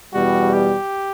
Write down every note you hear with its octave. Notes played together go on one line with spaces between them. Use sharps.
E2 B2 G3 F#4
G4